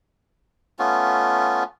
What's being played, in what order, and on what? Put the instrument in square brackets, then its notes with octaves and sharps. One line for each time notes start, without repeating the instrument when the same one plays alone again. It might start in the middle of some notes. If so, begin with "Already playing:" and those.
[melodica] A3 B3 C#4 F4